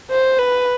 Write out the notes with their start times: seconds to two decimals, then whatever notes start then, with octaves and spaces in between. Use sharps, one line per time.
0.10 C5
0.39 B4